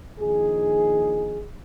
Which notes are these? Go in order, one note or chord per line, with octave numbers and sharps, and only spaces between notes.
A#1 D#3 D#4 G#4